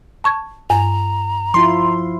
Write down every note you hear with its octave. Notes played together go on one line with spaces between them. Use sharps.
A5 C#6 G#6
G2 A#5
F3 E4 F4 C6